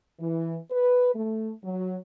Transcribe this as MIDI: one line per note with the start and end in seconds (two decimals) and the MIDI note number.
0.20 0.57 52
0.70 1.12 71
1.14 1.52 57
1.63 1.96 54